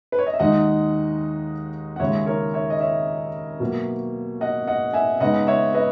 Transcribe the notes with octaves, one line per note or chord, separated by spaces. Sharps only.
B4
C#5
D#5
E5
D#2 D#3 G#3 D#4 D#5 F#5
F#5
D#2 C#3 G#3 C#5 E5
A#4 C#5
C#5 E5
D#5
C#5 E5
B2 F#3 A#3
D#5 F#5
D#5 F#5
E5 G#5
C#3 G#3 B3 D#4 D#5 F#5
C#5 E5
B4 D#5